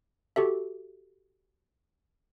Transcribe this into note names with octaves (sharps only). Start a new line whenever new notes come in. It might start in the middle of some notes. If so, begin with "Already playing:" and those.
F#4 G4 A4 E5